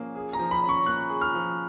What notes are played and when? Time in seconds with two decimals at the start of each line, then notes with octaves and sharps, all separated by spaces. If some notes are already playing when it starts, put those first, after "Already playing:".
Already playing: F3 A#3 C#4 G#4
0.16 G#4
0.33 A#5
0.39 F3
0.51 B5
0.64 C#4
0.69 C#6
0.86 A#3 F#6
1.09 G#4
1.21 F6
1.34 F3